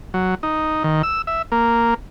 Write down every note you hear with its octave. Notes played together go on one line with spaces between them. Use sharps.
F#3
D#4
D#3
E6
E5
A#3